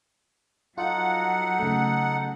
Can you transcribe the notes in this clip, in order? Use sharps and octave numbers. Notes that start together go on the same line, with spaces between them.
F#3 D#4 F4 A4 F#5
C#3 A3